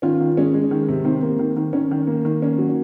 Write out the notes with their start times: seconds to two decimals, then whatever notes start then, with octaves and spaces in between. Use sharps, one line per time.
0.02 D#3 C#4 F4
0.20 D#3
0.37 G#3 C#4
0.54 G#3
0.71 D#3
0.88 C3
1.05 D#3 C4
1.23 A#3
1.39 D#3
1.56 D#3
1.73 D#3 C#4
1.91 D#3
2.07 A#3
2.25 D#3
2.42 A#3 C#4
2.58 F#3